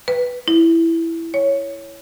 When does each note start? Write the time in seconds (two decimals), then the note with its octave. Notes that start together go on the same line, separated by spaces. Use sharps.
0.08 B4
0.48 E4
1.34 C#5